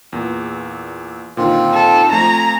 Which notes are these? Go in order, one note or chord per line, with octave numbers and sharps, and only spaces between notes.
E2 A#2
A#2 D3 D#3 C4 F4
A4
F3 A3 C4 G#5 A#5